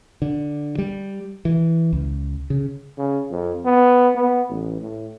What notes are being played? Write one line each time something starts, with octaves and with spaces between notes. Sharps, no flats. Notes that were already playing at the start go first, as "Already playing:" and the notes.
D3
G3
E3
C#2
C#3
C#3
F2
B3
B3
A1
A2